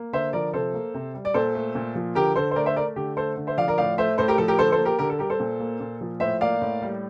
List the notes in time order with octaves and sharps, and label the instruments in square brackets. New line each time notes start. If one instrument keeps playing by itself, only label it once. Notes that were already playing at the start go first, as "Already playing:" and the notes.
Already playing: [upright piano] A#3
D3 C5 E5
F3 A#4 D5
C3 A4 C5
A#3
C3
G3
D5
A#2 A4 C5
A3
A#2
F3
D3 G4 A#4
D3 A4 C5
C5
A3 A#4 D5
C5 E5
A3 A#4 D5
D3 G4
A3 A4 C5
D3
C5 E5
F3 D5 F5
A#4 D5
A2 D5 F5
A3 C5 E5
A2 A4 C5
G4 A#4
F3 A4
G4 A#4
D3 A4 C5
A4 C5
A#3
G4 A#4
D3 G4 A#4
A4
G3 G4 A#4
A4 C5
A#2
A#3
A#2
F3
A2 C5 E5
A#3 D5 F5
A2
G3